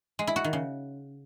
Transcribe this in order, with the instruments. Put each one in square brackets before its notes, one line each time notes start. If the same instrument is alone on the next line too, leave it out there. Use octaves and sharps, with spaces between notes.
[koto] G#3
E4
F#4
D#3
C#3